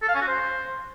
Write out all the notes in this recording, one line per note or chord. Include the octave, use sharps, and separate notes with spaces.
A4
F5
C#4
F#4
C5